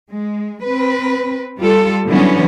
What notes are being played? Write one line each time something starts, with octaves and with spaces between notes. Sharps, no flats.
G#3
C4 B4
G3 F4 A4
D3 E3 F#3 G3 B3 C#4